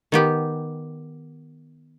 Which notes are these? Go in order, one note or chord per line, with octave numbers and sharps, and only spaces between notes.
D#3 B3 G4